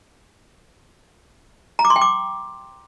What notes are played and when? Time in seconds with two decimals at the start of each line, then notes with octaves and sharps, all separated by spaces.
1.79 A#5
1.85 D6
1.90 C6
1.96 G5
2.01 D6